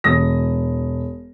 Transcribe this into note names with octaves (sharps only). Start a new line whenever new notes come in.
E1 D#6 A#6